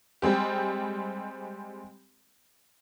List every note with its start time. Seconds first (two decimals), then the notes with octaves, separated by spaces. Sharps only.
0.22 G3 G#3 C4 G4